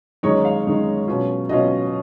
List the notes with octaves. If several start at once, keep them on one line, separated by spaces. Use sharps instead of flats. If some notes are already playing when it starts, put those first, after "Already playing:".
F#2 D#3 G#3 D#4 C#5
F5
F#2 D#3 G#3 D#4
B2 F#3 C#4 F4
B2 F#3 C#4 F4 D#5